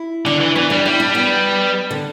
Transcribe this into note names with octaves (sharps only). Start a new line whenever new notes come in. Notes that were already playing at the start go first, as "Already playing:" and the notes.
Already playing: E4
D3 D4
E3
E3 B3
G3 D4
G3 E4
D4
B3
D3